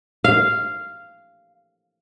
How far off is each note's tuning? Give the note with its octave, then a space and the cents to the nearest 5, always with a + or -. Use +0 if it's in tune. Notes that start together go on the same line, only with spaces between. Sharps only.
F5 -10